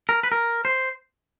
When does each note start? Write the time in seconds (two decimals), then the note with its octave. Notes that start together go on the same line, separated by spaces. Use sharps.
0.09 A#4
0.23 B4
0.32 A#4
0.65 C5